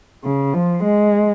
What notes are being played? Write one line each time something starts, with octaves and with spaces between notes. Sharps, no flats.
C#3
F3
G#3